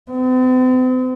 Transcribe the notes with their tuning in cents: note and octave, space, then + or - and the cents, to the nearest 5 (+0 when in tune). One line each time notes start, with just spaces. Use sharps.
C4 -45